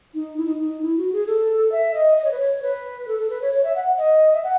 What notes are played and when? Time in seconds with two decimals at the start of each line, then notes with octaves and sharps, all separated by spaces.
0.14 D#4
0.37 E4
0.45 D#4
0.60 D#4
0.82 E4
0.97 F#4
1.12 G#4
1.27 A4
1.72 E5
1.94 D#5
2.17 D#5
2.24 C#5
2.31 B4
2.39 C#5
2.62 B4
3.07 A4
3.19 A4
3.29 B4
3.41 C#5
3.53 C#5
3.63 E5
3.75 F#5
3.97 D#5
4.33 E5
4.43 F#5